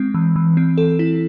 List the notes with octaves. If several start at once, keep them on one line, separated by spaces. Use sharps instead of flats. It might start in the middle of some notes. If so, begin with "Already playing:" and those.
Already playing: G#3 C4
E3
E3
C4
A4
E4